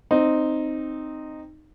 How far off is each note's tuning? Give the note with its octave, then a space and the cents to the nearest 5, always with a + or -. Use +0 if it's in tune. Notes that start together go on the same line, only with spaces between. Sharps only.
C4 +0 D#4 -10